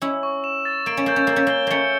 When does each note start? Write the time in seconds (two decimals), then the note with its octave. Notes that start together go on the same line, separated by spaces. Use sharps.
0.02 C#4 E4 E6
0.23 C#6
0.44 E7
0.65 A6
0.86 A#3 D7
0.97 C#4
1.06 A#3 G6
1.16 C#4
1.27 A#3 G6
1.36 C#4
1.47 A#3 G7
1.67 A3 A#3 C#4 C#7